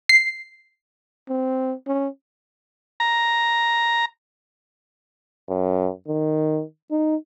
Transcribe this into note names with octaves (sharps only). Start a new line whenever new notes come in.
C7
C4
C#4
A#5
F#2
D#3
D#4